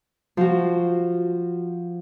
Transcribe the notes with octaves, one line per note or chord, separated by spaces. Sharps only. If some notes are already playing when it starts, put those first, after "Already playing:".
F3 F#4